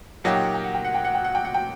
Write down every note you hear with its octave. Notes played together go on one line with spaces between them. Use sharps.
A#2 F#3 A#3 D#4 G4 F#5
G5
F#5
G5
F#5
G5
F#5
G5
F#5
G5
F#5
G5
F#5
G5